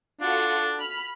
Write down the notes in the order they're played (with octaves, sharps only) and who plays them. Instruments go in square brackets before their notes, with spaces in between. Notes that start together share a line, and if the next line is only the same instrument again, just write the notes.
[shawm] D4 [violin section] F4 F#4 A4
[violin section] B5 F6